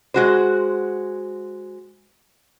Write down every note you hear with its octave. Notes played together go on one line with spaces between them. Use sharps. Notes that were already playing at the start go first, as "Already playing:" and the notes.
G#3 F#4 C5